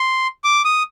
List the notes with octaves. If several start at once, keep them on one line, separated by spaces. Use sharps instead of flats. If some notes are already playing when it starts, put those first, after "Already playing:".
Already playing: C6
D6
D#6